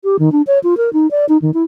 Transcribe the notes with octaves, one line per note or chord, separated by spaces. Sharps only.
G4
D#3
D4
C#5
F4
A#4
D#4
D5
D#4
D#3
E4